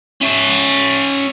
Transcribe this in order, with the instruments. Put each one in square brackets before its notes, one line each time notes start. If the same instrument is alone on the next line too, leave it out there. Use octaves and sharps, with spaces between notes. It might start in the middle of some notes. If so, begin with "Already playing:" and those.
[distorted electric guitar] C#4 E5